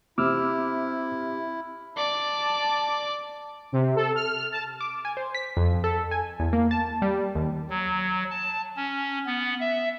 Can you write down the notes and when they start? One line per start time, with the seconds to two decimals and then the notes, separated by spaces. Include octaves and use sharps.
0.18 C3 E4 D6 E6 F6
1.97 D5 A5 D6
3.72 C3
3.96 A4
4.15 F6
4.52 A5
4.81 D6
5.05 G#5
5.17 C5
5.35 B6
5.57 F2
5.84 A4
6.11 G#5
6.39 E2
6.53 A#3
6.71 A5
7.02 G3
7.35 D#2
7.70 F#3
8.31 A5
8.77 C#4
9.26 B3
9.60 E5